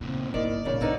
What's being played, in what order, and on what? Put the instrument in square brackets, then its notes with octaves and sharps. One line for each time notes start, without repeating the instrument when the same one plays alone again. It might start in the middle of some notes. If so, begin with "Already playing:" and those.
[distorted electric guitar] E2 A#2 [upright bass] C#3 [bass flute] C4
[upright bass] G1 A#3 [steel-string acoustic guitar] D#3 [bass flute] E4 [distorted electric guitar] D5
[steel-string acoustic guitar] A#2 C#3 [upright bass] E3 G3 [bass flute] C#5
[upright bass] B1 A2 [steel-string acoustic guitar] D3 D#4 [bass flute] B4